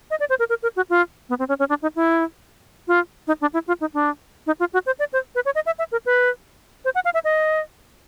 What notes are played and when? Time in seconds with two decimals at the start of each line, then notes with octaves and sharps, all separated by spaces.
0.11 D#5
0.20 D5
0.30 C5
0.39 A#4
0.49 A#4
0.63 A#4
0.76 F#4
0.90 F4
1.29 B3
1.39 C4
1.49 C#4
1.59 C#4
1.69 D4
1.82 D#4
1.96 E4
2.88 F4
3.27 D#4
3.41 D4
3.54 E4
3.68 F4
3.81 D#4
3.94 D4
4.47 D#4
4.60 F4
4.73 F#4
4.86 C5
4.99 D5
5.13 C5
5.35 B4
5.45 C#5
5.55 D#5
5.66 E5
5.79 E5
5.92 A#4
6.06 B4
6.85 C5
6.95 F#5
7.05 F5
7.14 E5
7.24 D#5